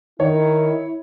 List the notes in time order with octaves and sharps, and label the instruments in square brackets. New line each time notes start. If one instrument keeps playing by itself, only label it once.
[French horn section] D#3 [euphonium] E4 [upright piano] C#5